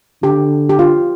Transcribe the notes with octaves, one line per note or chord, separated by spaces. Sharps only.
D3 G4
G4
F4